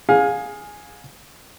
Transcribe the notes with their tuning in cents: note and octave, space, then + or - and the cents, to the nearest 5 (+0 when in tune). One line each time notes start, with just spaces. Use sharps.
G#4 +0 F5 +25